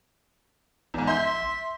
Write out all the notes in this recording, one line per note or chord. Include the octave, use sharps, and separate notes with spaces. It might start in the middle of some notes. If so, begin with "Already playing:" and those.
A#1 E2 G#2
E5 C6 G6